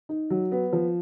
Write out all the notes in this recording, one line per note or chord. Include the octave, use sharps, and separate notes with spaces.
D#4
F#3
B3
F3